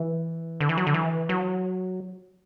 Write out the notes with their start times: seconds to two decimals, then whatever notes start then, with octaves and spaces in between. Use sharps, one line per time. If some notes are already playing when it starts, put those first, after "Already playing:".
Already playing: E3
0.60 D3
0.69 E3
0.77 F#3
0.87 D3
0.94 E3
1.29 F#3